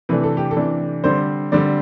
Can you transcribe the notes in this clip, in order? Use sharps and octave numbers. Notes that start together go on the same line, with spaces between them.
C3 E3 A3 D4 B4
A4
G4
A4
C3 E3 A3 D4
D3 G3 C4 C5
D3 G3 C4 D5